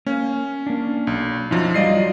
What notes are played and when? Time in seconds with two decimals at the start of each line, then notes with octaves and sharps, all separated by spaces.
0.06 A#3 C#4
0.66 A#3 D4
1.07 B1
1.51 F#2 F3 F#3 D#4
1.74 F#3 G3 F4 D5 D#5 C7